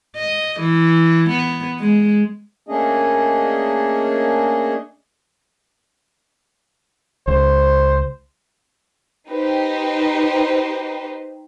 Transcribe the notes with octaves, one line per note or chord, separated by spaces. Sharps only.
D#5
E3
B3
G#3
A3 A#3 C#4 D4 G#4 D#5
C#2 C5
D#4 G4 B4 C5